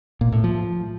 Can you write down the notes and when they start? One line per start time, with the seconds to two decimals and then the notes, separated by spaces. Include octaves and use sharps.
0.21 A#2
0.32 A2
0.44 F3